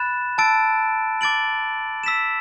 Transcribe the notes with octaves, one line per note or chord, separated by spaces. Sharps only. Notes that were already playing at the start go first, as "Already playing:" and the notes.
Already playing: B5 F#6 A6 E7
A5 E6 A6 D7
D6 A6 D7 F#7
E6 B6 E7